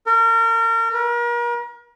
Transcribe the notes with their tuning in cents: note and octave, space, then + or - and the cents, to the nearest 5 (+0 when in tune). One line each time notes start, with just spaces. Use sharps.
A#4 -35
A#4 +40